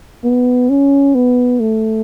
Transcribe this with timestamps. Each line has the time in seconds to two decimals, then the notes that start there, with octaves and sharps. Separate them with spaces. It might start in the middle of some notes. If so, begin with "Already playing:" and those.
0.24 B3
0.69 C#4
1.15 B3
1.60 A3